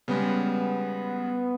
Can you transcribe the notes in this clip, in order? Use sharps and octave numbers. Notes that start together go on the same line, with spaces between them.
C#3 G3 G#3 B3